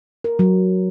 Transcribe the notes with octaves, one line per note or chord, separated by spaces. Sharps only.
A#4
F#3